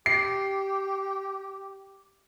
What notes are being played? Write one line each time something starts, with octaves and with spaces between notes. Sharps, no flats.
G4 C7